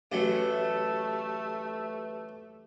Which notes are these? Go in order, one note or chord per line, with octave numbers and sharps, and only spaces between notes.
A1 A2 F#3 A3 G4 B4